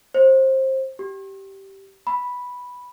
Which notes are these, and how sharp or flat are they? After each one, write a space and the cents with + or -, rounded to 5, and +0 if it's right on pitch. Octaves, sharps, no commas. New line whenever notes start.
C5 +20
G4 -15
B5 -5